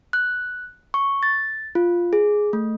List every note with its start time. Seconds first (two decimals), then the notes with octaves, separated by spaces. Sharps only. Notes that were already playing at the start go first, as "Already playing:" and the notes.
0.13 F#6
0.94 C#6
1.23 A6
1.75 F4
2.13 G#4
2.53 A3